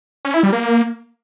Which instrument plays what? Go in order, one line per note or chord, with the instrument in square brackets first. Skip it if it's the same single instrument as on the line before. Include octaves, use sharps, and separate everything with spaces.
[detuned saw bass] C#4
E4
G3
A#3